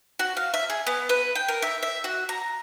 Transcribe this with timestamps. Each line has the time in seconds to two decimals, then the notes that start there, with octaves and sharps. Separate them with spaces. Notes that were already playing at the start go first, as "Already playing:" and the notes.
0.19 F#4
0.37 F5
0.54 E5
0.70 G#4
0.87 B3
1.09 B4
1.35 G5
1.48 A#4
1.62 E5
1.83 E5
2.04 F#4
2.29 A#5